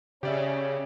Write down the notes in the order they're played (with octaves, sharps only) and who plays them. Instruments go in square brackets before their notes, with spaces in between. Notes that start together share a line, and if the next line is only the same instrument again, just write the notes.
[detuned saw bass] C#3 [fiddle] C#4 [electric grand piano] G4 D5 E5